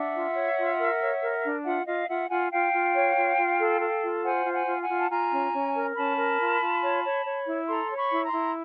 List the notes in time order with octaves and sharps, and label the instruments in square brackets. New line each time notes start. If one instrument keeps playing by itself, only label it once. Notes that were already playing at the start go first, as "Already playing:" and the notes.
Already playing: [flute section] D4 E5 F#5
F4
C#5
F4
A#4
C#5
A#4
D4
F4 E5 F#5
F4 D#5 F5
F4 E5 F#5
F4 F#5 G#5
F4 F5 G5
F4
C#5
F4
F4
A4
A4
F4
C5 F#5 G#5
F4
F#5 G#5
F4
F#5 G#5
F4
A5
F4 G#5 A#5
C#4
C#4
A#4
C#4 A5 B5
A#4
F4
F4
C#5
C#5
C#5
E4
A4 A#5 C6
C#5
B5 C#6
E4
A#5 C6
E4